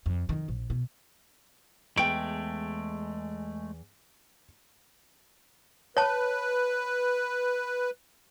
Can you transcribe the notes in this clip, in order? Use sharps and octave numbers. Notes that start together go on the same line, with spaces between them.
F2
F2 D#3
A#1
B2
E2 G#3 A3 G5 D7
B4 C#5 A5